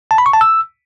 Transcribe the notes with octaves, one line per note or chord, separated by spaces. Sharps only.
A5
B5
C#6
A5
E6